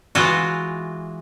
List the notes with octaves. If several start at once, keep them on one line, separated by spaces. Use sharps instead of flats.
E3 G#3 F4 F#4